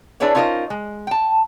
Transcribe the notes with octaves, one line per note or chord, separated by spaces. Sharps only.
D4 E4 G#4 B4 C#5 D5
C#4 D#4 F4 A#4 C5 D#5
G#3
G5 A5